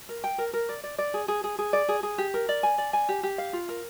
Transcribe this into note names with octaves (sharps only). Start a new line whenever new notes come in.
A#4
G5
A#4
A#4
D5
D5
D5
G#4
G#4
G#4
G#4
D5
G#4
G#4
G4
A#4
D5
G#5
D5
G#5
G4
G4
F5
F4
A#4